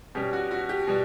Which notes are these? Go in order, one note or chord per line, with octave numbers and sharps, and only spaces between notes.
B2 G3 C#4 G4
F#4
F#4
G4
B2 G3